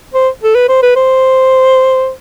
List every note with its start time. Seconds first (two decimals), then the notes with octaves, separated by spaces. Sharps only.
0.14 C5
0.43 A4
0.55 B4
0.69 C5
0.82 B4
0.96 C5